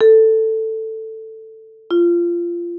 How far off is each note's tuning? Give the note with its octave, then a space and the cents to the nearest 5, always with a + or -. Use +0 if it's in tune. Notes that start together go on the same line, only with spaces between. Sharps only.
A4 +10
F4 -20